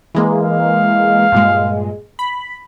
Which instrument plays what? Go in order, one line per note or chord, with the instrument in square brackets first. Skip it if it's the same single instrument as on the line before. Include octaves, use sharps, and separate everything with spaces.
[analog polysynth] E3 G#3 A#3
[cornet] F5
[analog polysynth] G2 A#2 G#3
B5